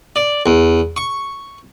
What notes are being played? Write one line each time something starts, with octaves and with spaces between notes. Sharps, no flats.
D5
E2
C#6